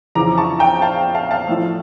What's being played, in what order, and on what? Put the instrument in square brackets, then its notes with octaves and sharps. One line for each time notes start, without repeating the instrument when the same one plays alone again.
[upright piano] F2 C#3 E3 A#5 D6
A5 C#6
G5 A#5
F5 A5
F5 A5
F5 A5
A2 F3 A3